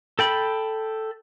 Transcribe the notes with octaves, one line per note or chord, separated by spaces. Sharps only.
A4 G5 B5